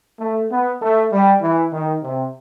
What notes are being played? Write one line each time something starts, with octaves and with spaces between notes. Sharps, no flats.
A3
B3
A3
G3
E3
D#3
C3